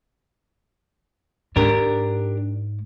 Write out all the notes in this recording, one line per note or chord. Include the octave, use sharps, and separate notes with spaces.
G#2 D4 G4 A#4